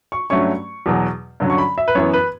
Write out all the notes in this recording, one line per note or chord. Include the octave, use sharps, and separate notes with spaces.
C#6
G2 F#3 A3 C#4 C#6
E2 B2 F#3
G2 D3 F#3 C#4
C#6
B5
E5
B4
F#2 E3 B3 C#5
B4